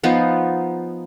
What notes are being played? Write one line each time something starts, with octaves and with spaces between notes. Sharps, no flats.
F3 B3 D#4 F4